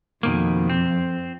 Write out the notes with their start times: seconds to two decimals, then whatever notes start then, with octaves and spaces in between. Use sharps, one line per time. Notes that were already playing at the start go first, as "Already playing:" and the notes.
0.23 F2 B2 D#3 A#3
0.70 C4